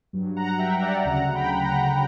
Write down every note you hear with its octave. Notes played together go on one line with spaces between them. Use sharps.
G2 F#3
F#5 A#5
E5 G5
D5 F#5
D2 C#3 F#3 F#5 A#5
G5 B5
F#5 A#5